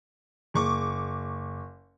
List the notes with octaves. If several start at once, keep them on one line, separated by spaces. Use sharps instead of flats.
F#1 C#6 D6